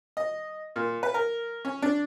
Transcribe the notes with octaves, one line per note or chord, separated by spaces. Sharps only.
D#5
A#2
B4
A#4
C#4
D4